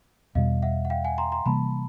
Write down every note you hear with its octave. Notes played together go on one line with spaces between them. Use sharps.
E2 B2 G3 D#5 F5
E5 F#5
F#5
F5 G5
F#5 G#5
A#5 C6
A#5 C6
C3 E3 G3 A#3 A5 B5